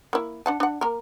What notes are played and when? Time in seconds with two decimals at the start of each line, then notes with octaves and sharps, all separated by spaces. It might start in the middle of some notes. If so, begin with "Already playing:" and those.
0.13 A#3 E4
0.46 D4 F#5 A5
0.60 D4 F#5
0.81 A#3 A#4